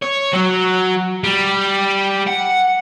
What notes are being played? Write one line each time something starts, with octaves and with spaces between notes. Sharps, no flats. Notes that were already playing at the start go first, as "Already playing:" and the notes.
C#5
F#3
G3
F#5